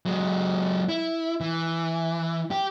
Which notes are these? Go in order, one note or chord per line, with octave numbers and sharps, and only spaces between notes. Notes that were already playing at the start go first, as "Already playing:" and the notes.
F#3 G#3
E4
E3
G4